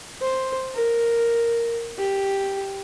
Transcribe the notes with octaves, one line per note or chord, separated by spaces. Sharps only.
C5
A#4
G4